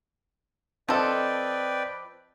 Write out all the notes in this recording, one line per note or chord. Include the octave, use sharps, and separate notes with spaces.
F3 C4 A4 B4 D5 D#5 G5